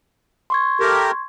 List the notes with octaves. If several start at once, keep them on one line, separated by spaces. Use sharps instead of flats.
C6 C#6 G#6
A3 G4 A#4